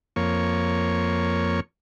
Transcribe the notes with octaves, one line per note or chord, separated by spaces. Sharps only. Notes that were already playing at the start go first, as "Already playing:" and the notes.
F2 A#3 C#5